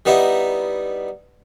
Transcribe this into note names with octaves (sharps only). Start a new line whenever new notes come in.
G3 B3 D#4 E4